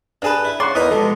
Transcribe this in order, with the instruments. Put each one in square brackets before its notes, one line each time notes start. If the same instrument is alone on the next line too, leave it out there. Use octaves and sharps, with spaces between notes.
[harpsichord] G2 A5 [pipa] D4 G#4 B4
[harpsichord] E4
[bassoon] C#3 [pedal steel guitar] F#4 D5 [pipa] C6
[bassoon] E2 [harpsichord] D#4 A#4 B4 [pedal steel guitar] D#5
[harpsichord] B2 G4 [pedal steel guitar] F3 G#3 [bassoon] A4